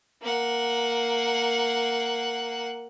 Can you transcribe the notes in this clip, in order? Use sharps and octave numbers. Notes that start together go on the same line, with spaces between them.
A#3 F#5